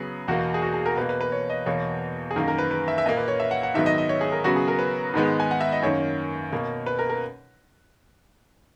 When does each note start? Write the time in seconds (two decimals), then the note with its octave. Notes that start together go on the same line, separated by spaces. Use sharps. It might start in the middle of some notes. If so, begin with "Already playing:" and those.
Already playing: C#3 F#3 B3 G#4
0.28 E2 B2 A#3 F#4
0.54 G#4
0.62 F#4
0.74 G#4
0.86 A#4
0.97 B2 B4
1.01 A#3
1.09 B4
1.21 B4
1.32 C#5
1.50 D#5
1.66 E2 B2 A#3 C#5
2.31 G#4
2.36 F#2 D#3 A#3 A#4
2.48 A#4
2.58 B4
2.71 B4
2.88 E5
2.98 E5
3.06 A#2 A#3 D#5
3.17 B4
3.28 C#5
3.40 E5
3.51 F#5
3.63 F#5
3.74 G#2 D#3 F#3 B3 E5
3.86 D#5
3.98 D#5
4.09 C#5
4.21 G#4
4.32 A#4
4.44 C#3 F#3 B3 F#4
4.56 G#4
4.68 A#4
4.79 B4
5.14 G#2 D#3 G#3 B3
5.40 G#5
5.51 F#5
5.61 E5
5.72 D#5
5.82 F#2 D#3 A#3 C#5
6.52 B2 A#3
6.86 B4
6.99 A#4
7.10 A#4